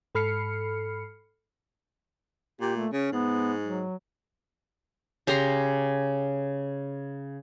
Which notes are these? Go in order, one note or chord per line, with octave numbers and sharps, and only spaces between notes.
G#2 A4 B5 F6 C7 C#7
A#2 G4
A3
C#3 C#4
G#2 B3
F#3
C#3 G4 A#5 C6